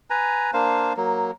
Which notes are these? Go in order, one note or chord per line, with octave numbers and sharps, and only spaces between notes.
B4 G#5 A#5
A#3 D4 C5 F5
F#3 A#3